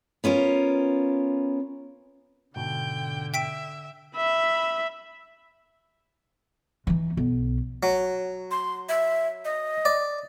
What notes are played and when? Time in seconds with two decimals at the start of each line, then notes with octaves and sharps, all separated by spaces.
0.24 B3 C#4 F4 A#4
2.56 G#2 B2 D3 G5
3.34 E5 G5 B6 D7
4.17 E5 B5
6.87 E3 D#4
7.17 B1
7.83 F#3
8.51 C6
8.89 E5
9.45 D#5
9.85 D5